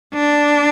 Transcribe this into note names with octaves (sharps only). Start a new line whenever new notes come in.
D4